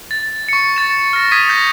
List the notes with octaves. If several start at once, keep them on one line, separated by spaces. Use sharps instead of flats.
A6
C#6 C#7
A6 E7
F6 A#6
D#6 G#6 B6 D#7
D#6 G6 A#6